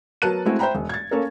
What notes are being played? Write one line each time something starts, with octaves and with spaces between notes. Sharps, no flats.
F#3 B3 A#4 A5 F#6 D#7
G#3 A3 C4 E4 F#4
C5 E5 G5 A#5 B5
E1
G#6 A6
A#3 C#4 A4 A#4